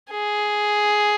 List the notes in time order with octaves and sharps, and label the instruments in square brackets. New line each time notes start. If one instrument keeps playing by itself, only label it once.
[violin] G#4